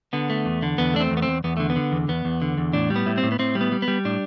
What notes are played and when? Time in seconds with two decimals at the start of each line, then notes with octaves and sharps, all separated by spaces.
0.13 D3 B3
0.30 A3
0.45 E2
0.62 D3
0.78 E2 B3
0.94 A3 D4
1.00 C4
1.11 E2
1.17 B3
1.22 C4
1.28 E2
1.44 E2 B3
1.57 D3 A3
1.70 B3
1.76 D3
1.92 E2
2.08 E2 B3
2.25 E2
2.42 D3
2.57 E2
2.73 A2 D4
2.90 G3
2.96 B3
3.06 A2
3.18 C4
3.23 A2
3.32 B3
3.39 A2 C4
3.55 G3
3.61 B3
3.72 G3
3.82 B3
3.88 G3
4.05 A2 D4